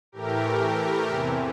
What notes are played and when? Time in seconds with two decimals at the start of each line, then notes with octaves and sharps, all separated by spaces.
0.12 A2 E3 A3 G4 A#4
1.07 E2 C3 E3